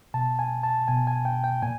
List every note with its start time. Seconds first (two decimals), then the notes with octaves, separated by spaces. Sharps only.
0.14 B2 A5
0.39 G#5
0.63 A5
0.88 B2 G#5
1.07 G#5
1.25 G5
1.44 G5
1.62 A#2 G#5